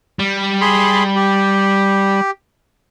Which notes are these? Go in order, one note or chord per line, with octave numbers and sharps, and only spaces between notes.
G3
G#4 B5 C6
G4